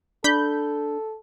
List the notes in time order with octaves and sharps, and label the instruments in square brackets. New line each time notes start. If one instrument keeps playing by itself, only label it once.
[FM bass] D4 [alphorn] A4 [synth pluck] B5 G6